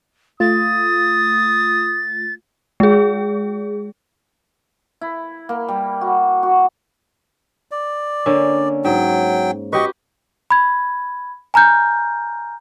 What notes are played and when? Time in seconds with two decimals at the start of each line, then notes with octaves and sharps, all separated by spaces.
0.40 A3 F4 D#6 A6
2.80 G#3 G#4
5.01 E4
5.49 A#3
5.68 G3
6.01 F#4
6.43 F#4
7.71 D5
8.26 D3 A#3 C#4
8.85 G#2 F#3 G5
9.73 F#4 G4 B4 D#5 C#6
10.51 B5 G#6
11.54 G#5 A#5 F6 G6